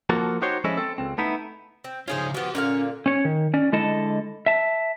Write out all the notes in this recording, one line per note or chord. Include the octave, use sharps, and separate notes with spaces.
F3 A#3 F#4 A4
D#4 F#4 G4 C5 C#5
F3 G#3 C#4 E4 A4 D#5
C4 A4
C#2 C4
A3 B3 D#4 E4
C4
C#3 C#4 D#4 F4 G#4 C5
F3 B3 F#4 G4
A#2 D3 C#4 F5
C#4 C#5
D#3
C#4 D5
D3 G#3 E4 A4 D#5 A5
E5 A5